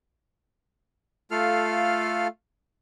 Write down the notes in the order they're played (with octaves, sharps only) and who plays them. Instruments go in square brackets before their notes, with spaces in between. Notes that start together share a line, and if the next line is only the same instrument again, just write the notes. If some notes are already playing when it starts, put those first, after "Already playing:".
[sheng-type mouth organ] A3 F4 A4 F5 F6